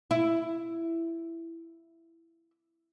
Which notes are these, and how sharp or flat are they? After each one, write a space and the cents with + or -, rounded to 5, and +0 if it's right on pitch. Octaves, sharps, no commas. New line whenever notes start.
E4 +10